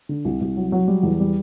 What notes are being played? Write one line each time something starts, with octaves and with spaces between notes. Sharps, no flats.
D3
C2
C2
F#3
F#3
G3
E2
G3